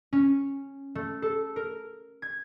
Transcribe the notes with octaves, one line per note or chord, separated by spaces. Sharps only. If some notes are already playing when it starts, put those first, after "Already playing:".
C#4
A3
A4
A#4
G#6